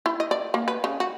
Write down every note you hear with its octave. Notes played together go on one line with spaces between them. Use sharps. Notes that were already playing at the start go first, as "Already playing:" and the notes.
E4
D#5
D5
A#3
B4
C#3
F#4